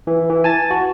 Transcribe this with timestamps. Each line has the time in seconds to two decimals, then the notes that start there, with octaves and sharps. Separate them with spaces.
0.07 E3
0.30 E3
0.44 G#5 A5 A6
0.71 F#4